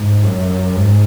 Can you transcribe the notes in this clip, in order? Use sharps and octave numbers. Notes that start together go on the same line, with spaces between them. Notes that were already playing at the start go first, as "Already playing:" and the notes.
Already playing: G#2
F#2
G#2